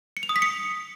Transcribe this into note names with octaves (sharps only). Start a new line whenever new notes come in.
C#7
F7
D#6
B6
C#7